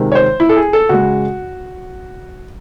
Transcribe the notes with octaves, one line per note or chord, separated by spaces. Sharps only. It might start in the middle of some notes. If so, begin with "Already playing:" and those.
Already playing: C3 D#3 G#3
C#5
C5
E4
A4
G#4
A4
C#3 G#3 F#4